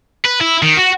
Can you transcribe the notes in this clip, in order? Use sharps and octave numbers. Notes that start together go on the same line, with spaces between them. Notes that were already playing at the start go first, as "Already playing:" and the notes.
B4
E4
D#3
F#4